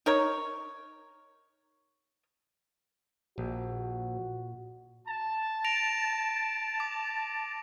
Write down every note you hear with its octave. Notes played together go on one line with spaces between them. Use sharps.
D#4 A#4 C#5
A#1 A#2 F#4
A5
A#6 D7 F7
D6